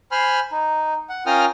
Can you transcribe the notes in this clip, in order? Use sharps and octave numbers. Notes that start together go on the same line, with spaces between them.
C5 G#5 B5 C6 F6
D#4
F#5
C#4 F4 A#4 G5 D#6 F6